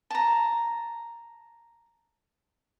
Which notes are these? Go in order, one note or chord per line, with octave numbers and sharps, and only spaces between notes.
A5 A#5